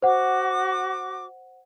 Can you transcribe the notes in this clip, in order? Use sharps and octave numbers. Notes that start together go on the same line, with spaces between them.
F#4 C5 F#5 D6